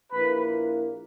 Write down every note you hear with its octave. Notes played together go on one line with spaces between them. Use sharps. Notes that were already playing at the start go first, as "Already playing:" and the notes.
A#1 A#2 A#3 E4 B4